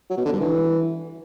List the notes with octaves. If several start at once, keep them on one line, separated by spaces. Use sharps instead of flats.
F#3
B2
D3
G2
E3